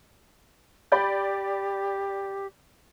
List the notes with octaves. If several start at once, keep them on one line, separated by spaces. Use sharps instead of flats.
G4 D5 B5 G6